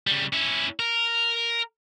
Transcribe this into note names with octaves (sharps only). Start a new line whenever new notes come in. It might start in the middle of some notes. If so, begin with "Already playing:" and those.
C#3 G3
C#4 E4
A#4